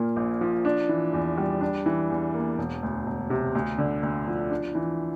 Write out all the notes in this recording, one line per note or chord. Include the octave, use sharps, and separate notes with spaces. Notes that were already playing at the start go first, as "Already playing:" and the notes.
Already playing: A#2 A#3
A#1
F3
D4
E3
E2
G3
D4
E3
E2
A#3
E1
D2
E1
C3
D2
D3
D2
F3
D4
E3